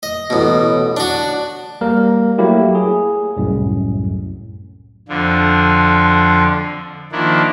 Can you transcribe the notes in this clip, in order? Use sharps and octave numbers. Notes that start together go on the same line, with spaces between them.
D#5
A1 B2
D4 F#4
G3 A#3 A#4
F#3 A3 A#3 E4 G4
G#4
C2 F#2 A2
F2 D3 F3
D#3 F3 A#3 D4 E4